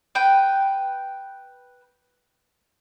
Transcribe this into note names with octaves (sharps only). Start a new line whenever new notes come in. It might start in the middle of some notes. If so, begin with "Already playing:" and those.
B4 G5